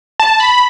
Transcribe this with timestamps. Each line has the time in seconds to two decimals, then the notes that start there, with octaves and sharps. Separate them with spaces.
0.20 A5
0.40 B5